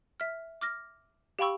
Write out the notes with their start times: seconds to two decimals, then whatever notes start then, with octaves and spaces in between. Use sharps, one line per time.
0.20 E5 F6
0.61 D6 F6 A#6
1.39 G4 F5 G5 B5 C#6 E6